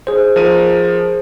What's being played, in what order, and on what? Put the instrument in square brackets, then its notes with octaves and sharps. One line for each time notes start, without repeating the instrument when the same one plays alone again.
[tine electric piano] G#4 C5
[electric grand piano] F3 A#4 D#7